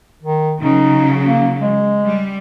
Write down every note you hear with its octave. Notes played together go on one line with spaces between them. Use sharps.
D#3
C#3 F#3 D#4
A#3
G#3
G3